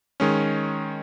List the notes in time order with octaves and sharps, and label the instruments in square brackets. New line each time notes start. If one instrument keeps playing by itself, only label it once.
[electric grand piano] D#3 G#3 C#4